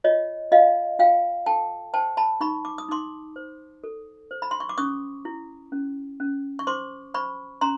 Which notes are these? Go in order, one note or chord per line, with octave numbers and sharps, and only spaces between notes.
F4 C#5 D#5
F4 D#5 F5
F4 F5 G5
A4 G5 A5
C5 G5 A5
A5 B5
D#4 B5 C#6
D6
D#6
D#4 C6 D6
C5
A4
C5
B5
C6
C#6
D6
C#4 C#6 D#6
E4
C#4
C#4
C#6
C5 C6 D6
C5 B5 C#6
C#4 A#5 C6